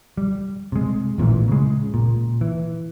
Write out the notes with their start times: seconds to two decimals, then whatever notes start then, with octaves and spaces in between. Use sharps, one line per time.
0.17 G3
0.72 C3 G#3
1.18 A1 A#2 C#3 E3
1.48 C#3 G#3
1.94 A#2
2.41 E3